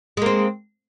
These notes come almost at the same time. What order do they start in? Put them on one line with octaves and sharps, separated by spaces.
G#3 A#3 C4